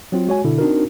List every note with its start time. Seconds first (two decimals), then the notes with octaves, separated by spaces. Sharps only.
0.12 F#3 C4 F4
0.27 G#3 F#4 C#5 G#5
0.44 B2 D3 E4
0.58 C4 D4 D#4 F#4 A#4